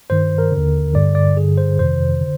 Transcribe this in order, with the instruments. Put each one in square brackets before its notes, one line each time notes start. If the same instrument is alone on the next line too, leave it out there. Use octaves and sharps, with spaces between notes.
[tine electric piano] G2 D#3 C5
A#4
D3
D#2
G2 D3 D5
D5
G2 D3 G#4
C5
F2 C3 D#3 C5
D3